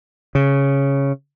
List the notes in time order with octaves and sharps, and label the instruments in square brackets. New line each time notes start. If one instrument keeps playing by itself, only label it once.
[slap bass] C#3